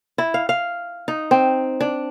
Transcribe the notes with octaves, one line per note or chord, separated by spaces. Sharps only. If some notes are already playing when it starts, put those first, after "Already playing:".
E4
F5
F5
D#4
C4
D4